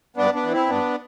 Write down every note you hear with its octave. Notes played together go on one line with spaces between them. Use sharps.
G2 B3 D4
B3 D4
E3
C4 E4
G2 B3 D4